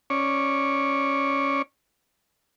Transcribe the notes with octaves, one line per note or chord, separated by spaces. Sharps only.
C#4 C#5 D5